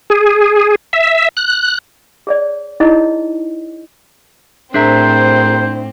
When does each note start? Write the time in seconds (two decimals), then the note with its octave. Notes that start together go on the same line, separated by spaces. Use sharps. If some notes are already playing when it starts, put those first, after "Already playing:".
0.10 G#4
0.93 E5
1.37 F#6
2.27 G#4 C#5 D5
2.80 D#4 E4 G#4 C#5 D#5
4.74 A2 C4 D4 G#4 A#4 C5 E5 A#5